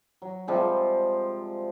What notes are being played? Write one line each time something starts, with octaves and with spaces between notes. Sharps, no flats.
F#3
C3 F3 G3 G#3